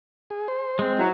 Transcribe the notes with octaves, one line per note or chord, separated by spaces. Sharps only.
G#4
C5
G#3 C4
F#3 E4